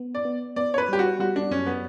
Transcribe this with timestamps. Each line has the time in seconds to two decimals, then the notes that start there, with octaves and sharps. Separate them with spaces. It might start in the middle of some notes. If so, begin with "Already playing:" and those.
Already playing: B3
0.15 D5
0.25 B3
0.56 B3 D5
0.74 C#5
0.78 B4
0.89 G3 G4
0.99 F#4
1.20 G3 F#4
1.36 D4
1.51 F#2 C#4
1.67 B3